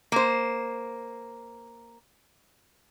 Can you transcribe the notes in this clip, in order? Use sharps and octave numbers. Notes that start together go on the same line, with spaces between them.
A#3 C5